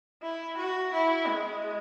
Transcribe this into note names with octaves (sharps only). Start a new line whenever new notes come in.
E4
F#4
E4
G#3